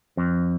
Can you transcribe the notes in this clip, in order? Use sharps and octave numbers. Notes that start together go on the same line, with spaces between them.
F2